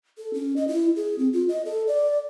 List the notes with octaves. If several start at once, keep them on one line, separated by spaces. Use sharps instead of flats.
A4
C#4
D#5
E4
G#4
C4
F4
D#5
A4
D5